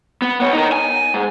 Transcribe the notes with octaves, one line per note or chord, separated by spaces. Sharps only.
B3
B3 C#5
D#4 A#4
G#5
G#2